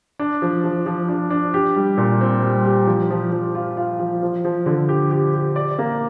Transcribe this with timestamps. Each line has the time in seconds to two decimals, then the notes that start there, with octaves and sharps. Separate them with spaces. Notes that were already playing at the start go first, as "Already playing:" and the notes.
0.19 D4
0.42 F3
0.64 F3
0.86 F3
1.09 D4
1.30 D4
1.54 G4
1.76 G3
1.98 A#2
2.21 C4
2.42 G3
2.65 G4
2.87 F3
3.11 F3
3.32 F3
3.55 F4
3.77 F4
4.00 F3
4.22 F3
4.45 F3
4.66 D3
4.89 G4
5.11 G4
5.33 G4
5.56 D5
5.79 A#3